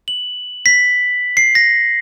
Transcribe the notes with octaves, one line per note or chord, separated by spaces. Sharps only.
F#7
B6
C7
A#6